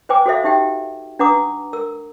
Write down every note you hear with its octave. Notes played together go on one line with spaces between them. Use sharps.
B4 C5 G5 G#5 D6
F#4 A4 C5 E5 F5
D#4 G4 E5 G5
D4 B4 F#5 A#5 D6 D#6
A#4 E6